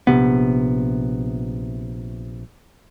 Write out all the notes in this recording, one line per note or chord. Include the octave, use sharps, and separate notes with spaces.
A#1 E2 C3 B3